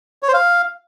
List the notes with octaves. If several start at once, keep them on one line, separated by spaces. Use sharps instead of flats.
C#5
C5
F5